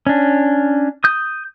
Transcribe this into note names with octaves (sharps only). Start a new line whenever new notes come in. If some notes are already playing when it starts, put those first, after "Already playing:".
C#4 D4
D#6 G6